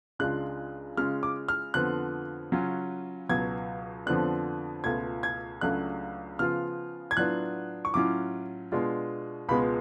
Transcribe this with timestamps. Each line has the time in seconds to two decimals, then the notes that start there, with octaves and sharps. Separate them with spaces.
0.19 C#2 C#3 G#3 D4 F4 F#6
0.97 C#3 G#3 C#4 F4 F6
1.23 D6
1.48 F6
1.74 F2 D3 F3 B3 F4 F#6
2.52 C#3 F#3 C#4 F4
3.29 C#2 B2 F#3 G#6
4.06 F2 D3 F3 B3 D4 F#6
4.84 C#2 B2 A3 F4 G#6
5.23 G#6
5.61 C#2 C#3 F#3 A3 D4 F#6
6.39 C#3 F3 B3 F4 F6
7.11 G#6
7.16 A2 F#3 B3 D4 F4 F#6
7.85 C#6
7.94 A2 F#3 C#4 F4 D6
8.72 B2 G#3 D4 F4
9.49 C#2 B2 G#3 B3 F4 B5